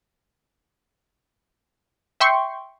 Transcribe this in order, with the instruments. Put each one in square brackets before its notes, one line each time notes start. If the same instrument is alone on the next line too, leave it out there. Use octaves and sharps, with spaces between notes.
[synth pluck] E5 G5 C6 C#6